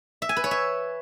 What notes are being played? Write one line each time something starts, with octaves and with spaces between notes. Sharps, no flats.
E5
G#5
B4
C#5
E5